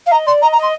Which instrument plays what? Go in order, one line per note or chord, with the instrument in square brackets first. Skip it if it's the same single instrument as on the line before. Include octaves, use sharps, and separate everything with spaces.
[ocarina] F5
[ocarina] D#5 [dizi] A#5
[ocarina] D5 [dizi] C6
[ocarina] D#5 [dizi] A#5
[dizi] A#5
[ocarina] D#5
[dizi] C6